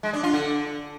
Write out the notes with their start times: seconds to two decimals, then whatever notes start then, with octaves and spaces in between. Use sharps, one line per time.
0.03 G#3
0.13 D4
0.23 F4
0.34 D3